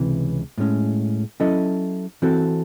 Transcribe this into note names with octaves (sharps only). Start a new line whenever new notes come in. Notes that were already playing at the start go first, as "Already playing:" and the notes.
Already playing: C#2 C3 E3
A2 G#3 C#4
F#3 C#4 E4 A4 D#5
E3 C4 F#4 A4